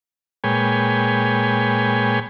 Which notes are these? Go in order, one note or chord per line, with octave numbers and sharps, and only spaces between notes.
A#2 G#3 B4 C#5 G5 G#5